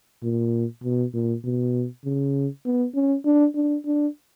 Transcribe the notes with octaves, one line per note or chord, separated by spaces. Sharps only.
A#2
B2
A#2
B2
C#3
B3
C#4
D4
D4
D4